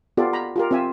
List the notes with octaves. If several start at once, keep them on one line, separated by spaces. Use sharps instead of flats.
B3 F4 G4 A4 D5
A#5 B5
F4 G4 A#4
C4 F4 E5 G#5